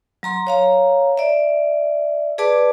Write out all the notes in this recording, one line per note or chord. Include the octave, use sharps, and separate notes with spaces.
F#3 A#5 C6
C#5 F5 A#5
D5 E5
G#4 B4 D5 A5 D6